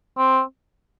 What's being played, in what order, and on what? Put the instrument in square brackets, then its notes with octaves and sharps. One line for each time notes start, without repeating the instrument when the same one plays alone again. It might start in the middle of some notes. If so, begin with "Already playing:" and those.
[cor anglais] C4